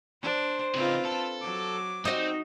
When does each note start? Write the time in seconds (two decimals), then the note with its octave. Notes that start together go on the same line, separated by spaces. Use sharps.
0.22 D4 C5
0.75 C#3 C4 D#4 F4 B4
1.05 A4
1.41 F#3 D6
2.05 C4 D#4 F#4 D#5